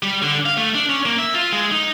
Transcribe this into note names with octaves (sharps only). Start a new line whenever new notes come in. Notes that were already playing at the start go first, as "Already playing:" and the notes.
G3
D3
F5
A3
D4
C#4
A#3
E5
F4
G#3
D#4